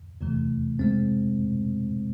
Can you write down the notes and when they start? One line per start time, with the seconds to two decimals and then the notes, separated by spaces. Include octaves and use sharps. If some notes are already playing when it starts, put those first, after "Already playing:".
0.21 E2 C3 E3 A3
0.79 C3 G#3 C4